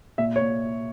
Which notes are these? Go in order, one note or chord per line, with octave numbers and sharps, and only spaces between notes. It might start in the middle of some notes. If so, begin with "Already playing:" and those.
A#2 E5
C#5
A#2